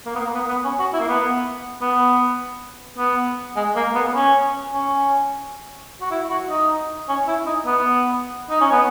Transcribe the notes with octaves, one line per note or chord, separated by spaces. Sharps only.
A#3
B3
A#3
B3
B3
C#4
F#4
E4
A#3
B3
B3
B3
G#3
A#3
B3
C#4
C#4
F#4
E4
F#4
D#4
C#4
E4
D#4
B3
D#4
C#4
B3